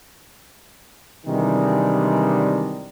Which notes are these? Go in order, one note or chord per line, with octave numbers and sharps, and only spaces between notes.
C3 D#3 E3 G3 G#3 D4